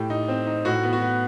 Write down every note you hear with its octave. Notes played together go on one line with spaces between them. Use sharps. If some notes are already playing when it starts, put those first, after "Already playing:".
Already playing: A2 G4
D#4
C4
D#4
A2 F#4
B3
F#4
B3